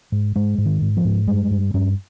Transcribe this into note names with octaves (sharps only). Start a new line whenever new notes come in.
G#2
G#2 G#3
G#2
D#3
G#2
F3
G#2
G2 G#3
G2
G2 C#4